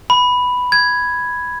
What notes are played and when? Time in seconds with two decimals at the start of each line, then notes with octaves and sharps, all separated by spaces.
0.10 B5
0.72 G#6